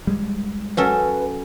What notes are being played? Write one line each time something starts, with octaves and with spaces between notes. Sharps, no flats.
G3 G#3
F#3 C#4 A4 B4